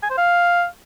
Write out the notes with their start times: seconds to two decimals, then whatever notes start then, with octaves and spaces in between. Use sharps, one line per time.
0.03 G#5
0.10 C5
0.18 F5